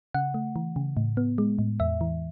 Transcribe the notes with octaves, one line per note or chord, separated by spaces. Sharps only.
C#3 F#5
A3
E3
C#3
A2
B3
G#3
A2
E2 E5
E3